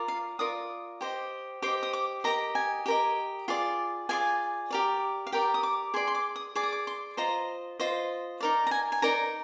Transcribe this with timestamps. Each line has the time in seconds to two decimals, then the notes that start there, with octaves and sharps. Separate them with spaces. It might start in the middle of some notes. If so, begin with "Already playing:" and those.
Already playing: F4 A#4 D5
0.08 F5
0.39 F4 A#4 D5 D#6
1.01 G4 C5 D#5
1.62 G4 C5 D#5 D6
1.83 D#6
1.93 D6
2.24 G4 A#4 D#5 A#5
2.55 G#5
2.86 G4 A#4 D#5
3.48 F4 G#4 D5
4.09 F4 G#4 D5 G#5
4.71 G4 A#4 D5
5.27 F5
5.32 G4 A#4 D5 G5
5.54 D#6
5.63 D6
5.94 G#4 D5 C6
6.07 C6
6.15 D6
6.36 D#6
6.55 G#4 D5 D6
6.63 D#6
6.72 D6
6.87 C6
7.17 F4 C5 D#5 A#5
7.80 F4 C5 D#5
8.41 D#4 A#4 D5
8.67 A#5
8.71 G#5
8.92 G#5
9.02 D#4 A#4 D5 A#5